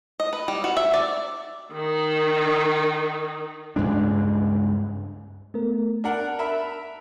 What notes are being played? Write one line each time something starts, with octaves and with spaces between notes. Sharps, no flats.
D#5
B4
G3
F#4
E5
D5
D#3 D#4
C#2 G2 G#3 D4
A3 B3 A#4
D4 A#4 F#5 A5
A#4 E5 B5